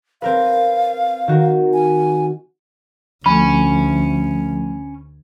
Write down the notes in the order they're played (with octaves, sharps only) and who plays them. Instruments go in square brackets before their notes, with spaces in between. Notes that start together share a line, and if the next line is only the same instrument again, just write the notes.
[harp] C4 A#4 B4 [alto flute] F5
[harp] D#3 F#4 A#4
[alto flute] G#5
[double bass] D2 [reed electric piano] F3 A3 [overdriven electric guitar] C#4 [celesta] B5